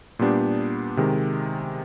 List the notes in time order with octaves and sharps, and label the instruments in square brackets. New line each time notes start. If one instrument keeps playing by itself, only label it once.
[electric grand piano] A#2 G3 B3 D4 G4
C3 D#3 G#3